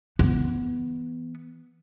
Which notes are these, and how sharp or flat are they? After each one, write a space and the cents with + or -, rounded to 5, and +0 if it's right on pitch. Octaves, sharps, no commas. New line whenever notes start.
E3 +0 B3 +0